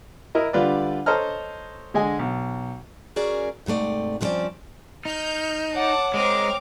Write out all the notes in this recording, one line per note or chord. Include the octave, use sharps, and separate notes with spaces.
E4 A#4 D#5
D3 G3 F4 B4 D5
A4 C5 C#5 D#5 A#5 F6
D3 G#3 D#5 G#5
B1
C#4 F#4 G#4 A#4 D5
G#2 C3 F#3 A3 D5
G2 F3 G3 C4 C#4 D5
D#4 F6 G6
C#5 F#5 A5 D6
G#3 C4 A#4 D6 F6